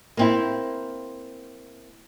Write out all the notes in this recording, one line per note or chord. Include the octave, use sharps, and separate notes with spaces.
A#3 C4 E4